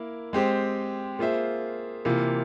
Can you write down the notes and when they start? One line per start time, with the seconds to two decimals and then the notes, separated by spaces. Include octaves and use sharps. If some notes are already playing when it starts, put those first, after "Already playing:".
Already playing: A#3 E4 A#4
0.33 G#3 C4 G4 C5
1.19 A#3 F4 G#4 C5 E5
2.05 C3 E3 A#3 F4